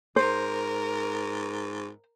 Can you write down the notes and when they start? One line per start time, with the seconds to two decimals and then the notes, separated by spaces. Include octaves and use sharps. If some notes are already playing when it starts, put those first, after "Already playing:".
0.16 G#2 A#4 C5